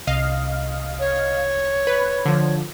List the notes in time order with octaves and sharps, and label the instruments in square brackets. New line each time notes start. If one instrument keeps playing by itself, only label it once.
[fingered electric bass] C2 [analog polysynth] D#5 F5
[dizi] C#5
[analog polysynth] B4
D3 F3